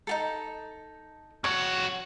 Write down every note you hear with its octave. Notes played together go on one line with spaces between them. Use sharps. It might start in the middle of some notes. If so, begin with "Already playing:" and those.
D#4 F4 A4
F2 F#4 C#5 C#6